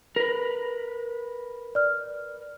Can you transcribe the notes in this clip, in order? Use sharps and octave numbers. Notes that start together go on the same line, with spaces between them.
A#4 B4
D5 F6